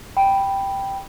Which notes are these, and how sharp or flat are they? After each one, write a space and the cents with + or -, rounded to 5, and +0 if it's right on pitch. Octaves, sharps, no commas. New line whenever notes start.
G5 +0 B5 +0